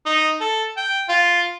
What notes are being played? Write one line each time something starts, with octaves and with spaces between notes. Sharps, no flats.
D#4
A4
G5
F4